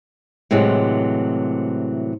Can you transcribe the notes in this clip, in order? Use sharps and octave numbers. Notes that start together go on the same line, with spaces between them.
A2 C3 E3 F#3 G#3